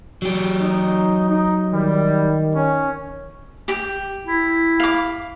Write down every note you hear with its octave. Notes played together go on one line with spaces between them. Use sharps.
F#3 G4
D#4
D#4
D#3 G3
C#4
G4 G5
E4
F5 D6